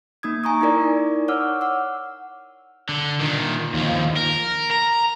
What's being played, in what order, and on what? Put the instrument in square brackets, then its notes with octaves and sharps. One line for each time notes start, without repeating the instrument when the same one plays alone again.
[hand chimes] A#3 D#4 D#6 G#6
G#5 A#5 C#6 D#6
D#4 E4 A#4 D5
C#5 F#5 D6 E6 F6
F#5 E6
[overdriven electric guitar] D3
A#2 D#3
D#2 F3
A#4
A#5